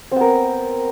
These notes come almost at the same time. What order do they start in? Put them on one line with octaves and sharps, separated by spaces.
C4 B3 A#4